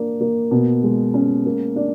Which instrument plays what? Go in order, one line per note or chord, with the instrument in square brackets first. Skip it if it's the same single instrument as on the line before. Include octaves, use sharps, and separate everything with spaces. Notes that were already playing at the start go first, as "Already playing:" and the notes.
Already playing: [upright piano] A#3 D4
A#3
B2
G#3
C#4
A#3
D4